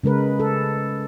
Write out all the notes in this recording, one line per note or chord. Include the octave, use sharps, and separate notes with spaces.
C#3 G#3 A#4 B4
A4